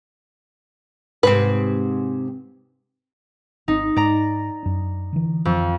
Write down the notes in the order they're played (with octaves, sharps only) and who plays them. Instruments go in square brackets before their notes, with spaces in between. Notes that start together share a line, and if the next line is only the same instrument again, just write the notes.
[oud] G#2 C3 C4 [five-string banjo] B4
[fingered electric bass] G#1 C4 [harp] D#4
[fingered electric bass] G#2 [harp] D5 A#5
[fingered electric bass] F#2 D4
D3 E3
[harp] F2